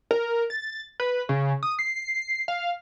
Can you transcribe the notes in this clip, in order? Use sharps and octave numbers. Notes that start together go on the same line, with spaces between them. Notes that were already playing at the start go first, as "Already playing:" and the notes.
A#4
A6
B4
C#3
D#6
C7
F5